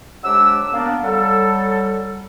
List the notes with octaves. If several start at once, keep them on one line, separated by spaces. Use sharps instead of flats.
F2 F#3 G#3 D4 G4 E6
A#3 B3 D4
F#3 G3 A4